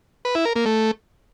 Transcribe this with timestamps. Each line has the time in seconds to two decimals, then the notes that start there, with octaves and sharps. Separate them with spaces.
0.25 B4
0.35 E4
0.45 A#4
0.56 A#3
0.66 A3